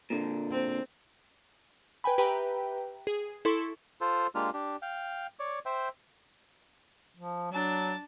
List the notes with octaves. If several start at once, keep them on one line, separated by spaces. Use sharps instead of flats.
A#2 D3
C4
B4 G5 G#5 B5
G4 B4 E5 G5 A#5 B5
G#4
E4 A4 C6 C#6
F4 A4 C5
G#3 A#3 D4 F4 G4 F6
D4 G4
F5 G5
C#5 D5
C5 E5 G5
F3
F#3 D4 A5 A6